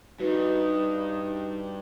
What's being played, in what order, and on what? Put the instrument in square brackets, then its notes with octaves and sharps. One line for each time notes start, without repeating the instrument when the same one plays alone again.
[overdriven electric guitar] G2 [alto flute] D#4 [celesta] F#4 B4